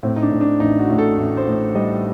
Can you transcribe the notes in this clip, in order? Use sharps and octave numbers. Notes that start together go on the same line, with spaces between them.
A2 C4
D#4
D4
A2
D4
A1 D#4
F#4
A2
A4
A1
C5
A2
G3 D#5